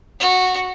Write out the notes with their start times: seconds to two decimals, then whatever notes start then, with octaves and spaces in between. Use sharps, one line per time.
0.19 F#4